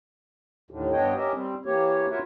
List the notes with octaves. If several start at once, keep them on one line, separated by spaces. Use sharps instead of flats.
D#2 A2 D3 D#3
G2 B3 D4 C#5 D#5 G5
C#4 G4 A#4 D#5 E5
G3 C4
E3 A#3 G4 C#5
F4 F#4 A#4 B4 C#5 E5